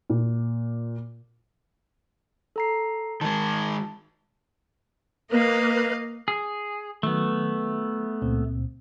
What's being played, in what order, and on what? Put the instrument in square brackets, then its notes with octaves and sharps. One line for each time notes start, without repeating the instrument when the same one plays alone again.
[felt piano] A#2
[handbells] A4 A#5 C7
[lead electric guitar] D#3 G#3 [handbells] A5
[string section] A#3 [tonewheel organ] A#4 B4 [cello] D#5 F5
[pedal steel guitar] G#4
[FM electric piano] D#3 F#3 [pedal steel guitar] A3 B3
[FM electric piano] C#2 A#2 C4